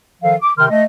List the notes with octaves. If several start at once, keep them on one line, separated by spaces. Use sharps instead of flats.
D#3 F3 A4 F5
D6
C3 D#3 G5 C6 F6
A3 D#5